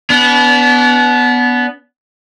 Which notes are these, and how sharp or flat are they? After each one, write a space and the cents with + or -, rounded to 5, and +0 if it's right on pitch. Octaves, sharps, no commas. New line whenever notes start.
B3 +0 D4 -40